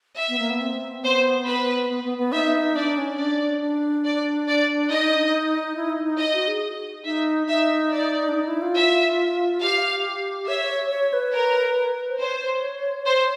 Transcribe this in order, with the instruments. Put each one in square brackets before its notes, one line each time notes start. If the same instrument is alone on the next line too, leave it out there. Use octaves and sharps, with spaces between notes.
[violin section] E5
[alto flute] B3
A#3
B3
C4
[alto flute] B3 [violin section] C5
[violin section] B4
[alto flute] B3
B3
B3
[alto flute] D#4 [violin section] E5
[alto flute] D4 [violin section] D5
[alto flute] C#4
[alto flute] D4 [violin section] D5
[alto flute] D4
[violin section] D5
D5
[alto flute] D#4 [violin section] D#5
[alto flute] E4
D#4
D#4
[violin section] D#5
[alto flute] F#4
G#4
[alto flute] D#4 [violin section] E5
[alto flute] D#4 [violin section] E5
[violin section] D5
[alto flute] D4
D#4
E4
F4
[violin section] E5
[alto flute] G4 [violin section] F5
[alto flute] C#5 [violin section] E5
[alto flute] C#5
B4
[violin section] A#4
[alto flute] C5
[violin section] C5 [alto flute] C#5
[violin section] C5